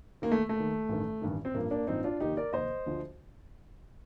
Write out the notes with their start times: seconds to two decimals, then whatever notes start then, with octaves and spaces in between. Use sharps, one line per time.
0.22 D#2 D#3 A#3
0.31 A3
0.49 A3
0.55 D#2 D#3
0.89 A1 G2 D#3
1.21 A1 G2 D#3
1.45 C4
1.54 A1 G2 F3 A#3
1.71 A#3 D4
1.87 A1 G2 F3 C4 D#4
2.04 D4 F4
2.20 F1 D#2 D#3 D#4 G4
2.37 A#4 D5
2.53 F1 D#2 D#3 C5 D#5
2.86 D2 D3 F3